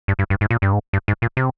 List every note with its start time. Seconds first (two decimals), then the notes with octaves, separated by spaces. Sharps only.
0.08 G2
0.19 G2
0.30 G2
0.41 G#2
0.51 A#2
0.62 G2
0.73 G#2
0.93 G2
1.08 G#2
1.22 A#2
1.37 C3